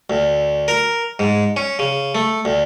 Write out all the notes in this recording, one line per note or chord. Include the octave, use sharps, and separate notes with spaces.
D2
A#4
G#2
C#4
C#3
A3
D2